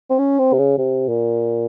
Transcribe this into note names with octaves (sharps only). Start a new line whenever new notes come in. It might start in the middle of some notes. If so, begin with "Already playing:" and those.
C4
C#4
C4
C3
C#3
C3
A#2